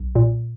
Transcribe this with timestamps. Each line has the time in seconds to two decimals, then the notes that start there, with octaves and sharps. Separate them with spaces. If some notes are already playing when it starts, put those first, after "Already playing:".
Already playing: B1
0.15 A#2